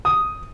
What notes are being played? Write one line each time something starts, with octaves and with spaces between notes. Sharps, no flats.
D#6